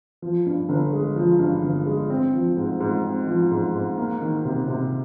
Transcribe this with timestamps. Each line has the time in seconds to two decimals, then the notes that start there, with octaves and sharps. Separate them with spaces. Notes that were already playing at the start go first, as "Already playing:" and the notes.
0.22 F3
0.46 G2
0.69 G1
0.93 G#3
1.16 F3
1.39 G2
1.63 G1
1.86 G#3
2.10 C4
2.33 F3
2.57 G#2
2.80 G#2
3.04 C4
3.27 F3
3.51 G#2
3.74 G#2
3.98 A#3
4.22 D#3
4.45 C3
4.68 C3